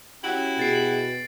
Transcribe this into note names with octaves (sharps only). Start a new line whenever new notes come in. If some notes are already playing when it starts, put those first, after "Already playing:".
C#4 E4 F#4 G4 F#7
B2 G#4 A6 C7 D7